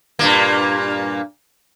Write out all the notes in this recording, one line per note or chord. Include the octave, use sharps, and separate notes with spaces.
G2 A#2 A#3